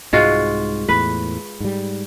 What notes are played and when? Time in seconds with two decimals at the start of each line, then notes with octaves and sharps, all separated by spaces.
0.13 C2 G#2 G#3 F4 F#4
0.89 E2 A2 B4
1.60 G#2 G3